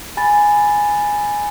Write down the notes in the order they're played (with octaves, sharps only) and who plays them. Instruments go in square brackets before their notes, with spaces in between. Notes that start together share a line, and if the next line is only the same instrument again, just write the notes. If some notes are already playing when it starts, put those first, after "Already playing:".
[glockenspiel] G#5 B5 A6